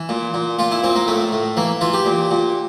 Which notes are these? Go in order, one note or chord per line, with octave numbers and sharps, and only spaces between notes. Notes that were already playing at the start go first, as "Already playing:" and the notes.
Already playing: E3
A#2
A#2
A#2 F4
E4
A#2 C4
A#3
A2 A3
A2
E3 A#3
E3 F4
G4
A#2
A#2